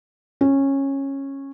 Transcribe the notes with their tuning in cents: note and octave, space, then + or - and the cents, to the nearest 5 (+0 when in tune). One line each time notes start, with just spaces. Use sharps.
C#4 -15